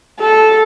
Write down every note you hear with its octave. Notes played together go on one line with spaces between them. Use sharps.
A4